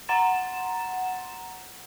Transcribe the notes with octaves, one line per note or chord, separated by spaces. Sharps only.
F#5 A#5 C6 A6 E7